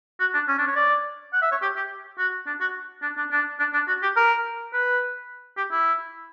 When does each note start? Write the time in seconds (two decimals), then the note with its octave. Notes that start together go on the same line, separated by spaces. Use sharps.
0.20 F#4
0.34 D4
0.48 C#4
0.58 D4
0.67 C#5
0.76 D5
1.33 F#5
1.42 E5
1.52 C#5
1.62 G4
1.76 G4
2.18 F#4
2.47 D4
2.61 F#4
3.02 D4
3.17 D4
3.31 D4
3.59 D4
3.74 D4
3.88 F#4
4.03 G4
4.16 A#4
4.73 B4
5.57 G4
5.72 E4